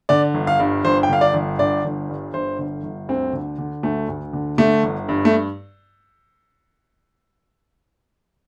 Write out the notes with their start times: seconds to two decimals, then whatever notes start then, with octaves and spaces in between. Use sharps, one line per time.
0.09 D3 D5
0.34 G1
0.47 F5
0.60 G2
0.84 G1 C5
1.03 G5
1.10 D3 F5
1.21 D5
1.34 G1
1.59 D3 D5
1.84 G1
2.09 G2
2.34 G1 C5
2.59 D3
2.83 G1
3.09 D2 C4
3.33 D3
3.59 D3
3.83 D2 A3
4.08 D2
4.33 D3
4.58 D3 A3
4.83 G1
5.09 G2
5.25 A3